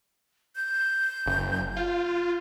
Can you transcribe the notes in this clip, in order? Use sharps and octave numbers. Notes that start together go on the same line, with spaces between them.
G6
F#1
F4